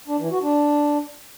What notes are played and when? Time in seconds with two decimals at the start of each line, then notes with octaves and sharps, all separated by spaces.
0.08 D4
0.19 E3
0.31 F#4
0.42 D4